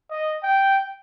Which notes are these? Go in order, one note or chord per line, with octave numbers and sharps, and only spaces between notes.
D#5
G5